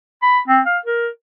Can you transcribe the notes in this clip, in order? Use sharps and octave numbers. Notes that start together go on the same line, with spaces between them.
B5
C4
F5
A#4